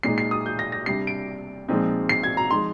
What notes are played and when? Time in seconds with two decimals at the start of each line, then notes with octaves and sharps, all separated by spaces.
0.03 A#2 G#3 D#4 C7
0.18 C7
0.31 D#6
0.46 G6
0.59 A#6
0.72 A#6
0.86 C3 G3 D4 C7
1.07 D7
1.68 A#2 F3 G#3 C4 D#4
2.09 C7
2.23 G#6
2.37 A#5
2.51 F3 G#3 D#4 C6